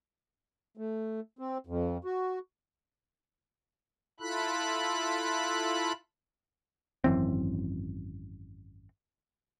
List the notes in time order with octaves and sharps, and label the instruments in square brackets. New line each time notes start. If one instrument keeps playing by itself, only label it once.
[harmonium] A3
C4
F2
F#4
[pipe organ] E4 F4 A4 B5 F#6
[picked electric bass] G#1 F#2 E3 C4